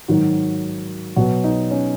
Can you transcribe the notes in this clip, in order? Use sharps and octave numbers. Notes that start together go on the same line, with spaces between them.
G#2 D#3 F#3 F#4
B2 F#3 B3 F#4
D#4
C#4